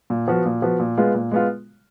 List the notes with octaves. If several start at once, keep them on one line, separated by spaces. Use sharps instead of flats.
A#2
F3 B3 F#4
A#2
F3 B3 F#4
A#2
G#3 B3 F4
A#2
G#3 B3 F4